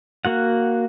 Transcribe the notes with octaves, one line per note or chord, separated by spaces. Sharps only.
A#3 F#4 F#5